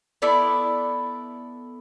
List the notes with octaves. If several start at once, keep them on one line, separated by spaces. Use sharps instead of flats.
B3 E4 A4 D5